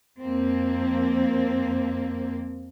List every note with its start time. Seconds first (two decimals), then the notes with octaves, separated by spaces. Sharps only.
0.20 F2 F3 A#3 C4